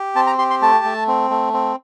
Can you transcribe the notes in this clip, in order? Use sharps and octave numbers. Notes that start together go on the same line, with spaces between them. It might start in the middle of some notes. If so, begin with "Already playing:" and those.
Already playing: G4
C4 A5
A#5
G4 C6
C6
A3 A5
A3
C4
A3
C4